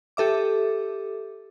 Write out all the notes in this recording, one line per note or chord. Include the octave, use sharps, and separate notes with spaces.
G4 A4 E5 D6